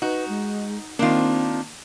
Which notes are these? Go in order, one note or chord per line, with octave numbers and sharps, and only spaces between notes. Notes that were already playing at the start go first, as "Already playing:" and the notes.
D#4 F#4 B4
G#3
D#3 A#3 C4 D4 D#4 F4